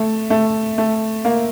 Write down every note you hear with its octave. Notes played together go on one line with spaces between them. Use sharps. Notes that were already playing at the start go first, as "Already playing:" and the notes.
Already playing: A3
A3
A3
A#3